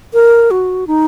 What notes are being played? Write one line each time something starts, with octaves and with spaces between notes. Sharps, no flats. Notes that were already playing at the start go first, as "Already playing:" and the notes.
A#4
F#4
D#4